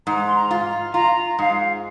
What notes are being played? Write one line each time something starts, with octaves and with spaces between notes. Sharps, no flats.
G#2 A#5
C6
A#5
F4
F4 A#5
G#2 F5